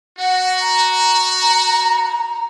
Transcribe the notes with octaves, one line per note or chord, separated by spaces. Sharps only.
F#4 F#5
A#5